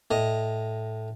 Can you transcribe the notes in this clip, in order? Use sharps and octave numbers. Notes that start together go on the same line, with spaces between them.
A2 D#5